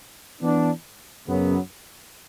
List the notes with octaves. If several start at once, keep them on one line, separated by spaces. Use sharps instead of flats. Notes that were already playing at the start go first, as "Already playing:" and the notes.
E3 B3 D4
F#2 C#3 F#3 B3